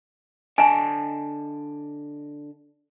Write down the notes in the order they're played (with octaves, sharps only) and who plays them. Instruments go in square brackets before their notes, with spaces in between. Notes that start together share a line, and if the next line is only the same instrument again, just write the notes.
[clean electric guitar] D3 D#5 A5 [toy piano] G#5